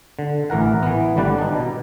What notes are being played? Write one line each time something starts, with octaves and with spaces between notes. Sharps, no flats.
D3
A1 E3 A#4 F#5
E3 B3
G#1 D3 G3 B4 D5 F#5
D4 D#4
B2